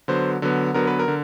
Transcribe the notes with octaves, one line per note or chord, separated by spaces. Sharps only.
D3 F#3 B3 C5
D3 F#3 B3
D3 F#3 B3 A#4
B4
A#4
D3